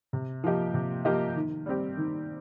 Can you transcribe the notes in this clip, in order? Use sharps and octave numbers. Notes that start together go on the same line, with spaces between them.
C3
F3 A#3 G4 D#5
C3
F3 A#3 G4 D#5
D#3
G3 C4 G4
D#3